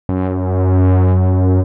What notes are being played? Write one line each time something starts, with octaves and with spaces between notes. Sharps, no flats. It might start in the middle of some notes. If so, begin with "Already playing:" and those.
F#2